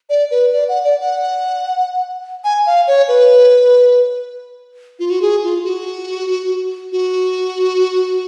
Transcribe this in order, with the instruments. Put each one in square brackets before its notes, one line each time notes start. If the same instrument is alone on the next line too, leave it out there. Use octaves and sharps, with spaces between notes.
[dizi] D5
B4
D5
F#5
D5
F#5
G#5
F5
C#5
B4
F4
F#4
G#4
F4
F#4
F#4